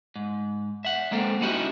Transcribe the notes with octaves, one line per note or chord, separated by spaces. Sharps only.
G#2
E5 F#5
G#3 A#3 C4 A4
G3 C#4 D#4 E4 F#4 G4